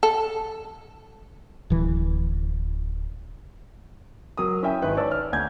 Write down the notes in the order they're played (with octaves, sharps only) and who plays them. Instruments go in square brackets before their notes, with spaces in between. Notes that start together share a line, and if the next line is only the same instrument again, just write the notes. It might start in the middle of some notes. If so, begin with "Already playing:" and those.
[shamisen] A4
[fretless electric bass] D1 E3
[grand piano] F#3 A#4 D#6
C#4 E4 E5 G5 G#5
G#1 D#3 E4 B4 E5
B4 C#5 D5 A5 E6
F6
D2 G#5 G6 G#6